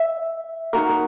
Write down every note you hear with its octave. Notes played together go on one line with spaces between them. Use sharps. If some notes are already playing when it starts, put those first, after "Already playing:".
Already playing: E5
D#4 F#4 A#4